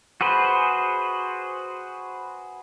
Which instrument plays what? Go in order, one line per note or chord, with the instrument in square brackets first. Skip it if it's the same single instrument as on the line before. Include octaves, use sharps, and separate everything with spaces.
[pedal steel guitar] F#4 G#4 B4 C5